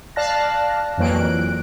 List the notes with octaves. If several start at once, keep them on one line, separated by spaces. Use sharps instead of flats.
D5 F5 A5 F#6 A#6
F2 E3 F#3 A#3 F#6 D7